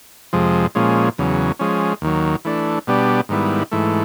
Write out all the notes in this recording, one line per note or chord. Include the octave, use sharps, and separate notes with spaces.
F2 C3 F3 G#3
A#2 F3 G#3 C#4
E2 C#3 F#3
F3 G#3 C#4
D#2 D#3 F#3
E3 A3 D4
B2 G3 B3 D4 G4
G#2 D#3 G3 B3 E4
G#2 E3 A3